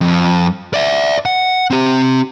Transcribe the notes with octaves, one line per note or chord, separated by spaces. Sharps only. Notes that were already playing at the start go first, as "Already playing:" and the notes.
F2
D5 E5
F#5
C4 G4